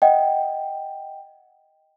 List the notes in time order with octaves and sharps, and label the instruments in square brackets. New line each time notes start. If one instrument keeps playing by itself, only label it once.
[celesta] D#5 F#5 G5